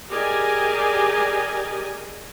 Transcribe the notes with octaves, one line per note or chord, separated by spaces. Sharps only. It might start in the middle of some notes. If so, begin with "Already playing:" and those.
G4 G#4 A#4 D5 D#5 G#5